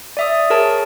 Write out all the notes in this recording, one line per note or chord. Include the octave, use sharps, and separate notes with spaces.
D5 E5 D#6
G#4 A#4 C#5 A5